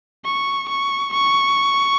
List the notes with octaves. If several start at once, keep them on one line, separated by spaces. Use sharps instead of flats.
C#6
C#6
C#6